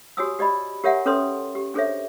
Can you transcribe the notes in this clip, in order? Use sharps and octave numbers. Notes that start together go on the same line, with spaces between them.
F#4 G4 C#5 G#5 D#6 E6
G4 D5 D#5 B5
G4 A#4 C#5 E5 F#5 G#5
C#4 A4 B4 C#5 C6 D#6
G4
D4 G#4 A4 C5 C#5 E5